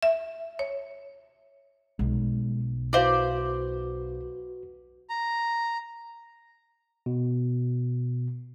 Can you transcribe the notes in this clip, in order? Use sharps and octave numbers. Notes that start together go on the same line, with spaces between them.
E5
C#5
B1 G#3
E4 F#4 B4 C5 D5 E5 F5
A#5
B2